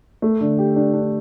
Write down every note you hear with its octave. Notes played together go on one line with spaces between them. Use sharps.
A3
D3
G4
D4
D4